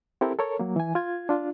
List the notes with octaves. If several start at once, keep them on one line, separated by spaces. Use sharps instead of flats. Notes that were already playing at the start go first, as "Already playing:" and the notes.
C4 E4 G4 A4 A#4
A4 A#4 C#5
F#3 A#3
E3 G#5
F4 G#6
D4 F4